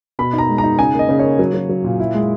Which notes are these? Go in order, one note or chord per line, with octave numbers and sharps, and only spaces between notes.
B2 B5
D#4
A#5
G#3
A#5
D#4
C#3 G#5
A#3
D#5
C#3
A#3 C#5
F#3
F#3
F#3
A#2
E4
G#3